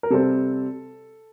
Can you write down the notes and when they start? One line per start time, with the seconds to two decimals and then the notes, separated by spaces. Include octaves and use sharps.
0.03 A#4
0.10 C3 G3 C4 A4